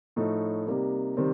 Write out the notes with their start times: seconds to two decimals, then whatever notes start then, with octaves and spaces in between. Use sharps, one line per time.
0.16 A2 F3 A3 D#4
0.67 C3 G3 A#3 D#4
1.17 C3 D#3 G3 C4